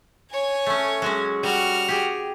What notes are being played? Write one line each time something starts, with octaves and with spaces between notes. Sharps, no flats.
C#5 G#5
A3 C#4
F#3 G#3 C#4
G3 F#4 F6
G4 G#4